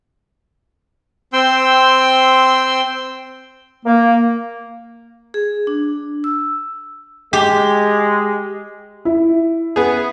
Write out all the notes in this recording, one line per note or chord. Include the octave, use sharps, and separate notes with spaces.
C4 G5 C6 E6
A#3
G#4
D4
E6
G#3 G4
E4
B3 G#4